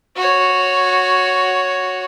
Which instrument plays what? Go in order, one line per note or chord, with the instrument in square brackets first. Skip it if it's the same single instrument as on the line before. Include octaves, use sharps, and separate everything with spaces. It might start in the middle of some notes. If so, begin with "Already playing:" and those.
[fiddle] F#4 C#5